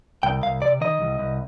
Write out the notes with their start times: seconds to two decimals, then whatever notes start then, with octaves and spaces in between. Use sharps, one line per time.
0.23 C2 G5
0.43 C2 F5
0.62 C3 D5
0.81 D#3 D#5
1.01 C2
1.19 C2